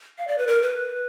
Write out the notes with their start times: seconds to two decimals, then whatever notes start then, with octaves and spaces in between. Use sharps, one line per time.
0.18 F5
0.28 D5
0.38 B4
0.47 A#4
0.62 B4